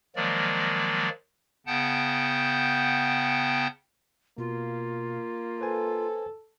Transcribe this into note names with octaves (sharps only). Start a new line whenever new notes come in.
D#3 F3 F#3 G#3 A#3 D5
C#3 B3 F#5 G5 A5 G6
B2 A#3 F4
A4 B4 C5 G#5